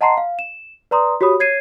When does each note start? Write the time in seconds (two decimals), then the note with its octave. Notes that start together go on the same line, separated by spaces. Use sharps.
0.01 D#5 F#5 A5 A#5 C6 C7
0.17 F5
0.39 E7
0.91 B4 D5 A#5 C6 D#6
1.21 F#4 G4 C#5 B5 D#6
1.40 C#5 G#6 C7 D#7